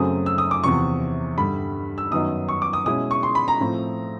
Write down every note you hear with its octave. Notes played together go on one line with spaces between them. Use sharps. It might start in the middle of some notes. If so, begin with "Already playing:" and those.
Already playing: F#2 C#3 F#3 A3 C4 D#6
E6
D#6
D6
E2 C3 F3 C#6
G2 D3 G3 B5
E6
F#2 D#3 F#3 B3 D#4 D#6
C#6
D6
D#6
B2 G#3 C#4 E4 D#6
C#6
C6
B5
A#5
A2 F3 A3 C4